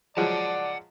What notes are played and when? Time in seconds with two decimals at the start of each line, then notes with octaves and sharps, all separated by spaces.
0.17 F3 F#3 G#3 D5 F#5 A5